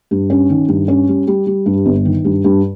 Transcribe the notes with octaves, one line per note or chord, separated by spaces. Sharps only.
G2
C#4
D#3
G2
C#4
G3
G3
G3
G2
G1
D#3
G2
G2